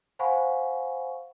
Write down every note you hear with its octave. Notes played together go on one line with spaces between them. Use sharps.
C5 F5 F#5 G#5 B5 C#6